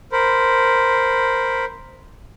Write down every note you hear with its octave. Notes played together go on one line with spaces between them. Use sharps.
A#4 C5 B5